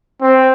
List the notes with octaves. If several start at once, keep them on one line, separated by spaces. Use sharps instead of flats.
C4